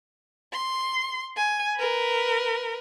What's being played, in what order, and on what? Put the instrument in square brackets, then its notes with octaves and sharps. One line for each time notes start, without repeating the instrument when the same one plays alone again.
[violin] C6
G#5
A#4 B4